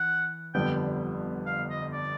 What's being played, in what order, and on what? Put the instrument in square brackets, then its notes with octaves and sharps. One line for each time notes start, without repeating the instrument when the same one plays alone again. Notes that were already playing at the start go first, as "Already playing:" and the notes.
Already playing: [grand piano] E3 [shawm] F#5
[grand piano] G1 F2 D3 G3 B3 [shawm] G5
[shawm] F5
D#5
D5